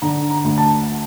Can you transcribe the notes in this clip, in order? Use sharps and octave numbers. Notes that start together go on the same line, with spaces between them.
D3 A#5
A#5
D2
A5